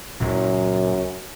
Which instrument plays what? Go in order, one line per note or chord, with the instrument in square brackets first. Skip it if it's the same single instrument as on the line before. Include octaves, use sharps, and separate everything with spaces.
[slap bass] C#2 A#2 F#3 [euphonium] F#2